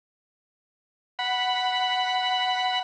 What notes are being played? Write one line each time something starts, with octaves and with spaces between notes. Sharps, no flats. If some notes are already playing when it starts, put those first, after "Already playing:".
F#5 B5